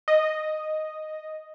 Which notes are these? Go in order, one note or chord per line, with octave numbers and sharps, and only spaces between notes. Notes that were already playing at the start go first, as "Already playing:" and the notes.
D#5